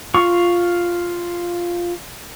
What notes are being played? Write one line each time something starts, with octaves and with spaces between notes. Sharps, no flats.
F4 C#6